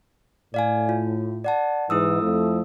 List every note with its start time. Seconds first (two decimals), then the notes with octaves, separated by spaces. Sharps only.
0.54 A2 D5 F5 G#5
0.89 F4
1.44 D5 F#5 A5
1.90 G#2 E3 E4 D#6 E6
2.22 F2 F3 A3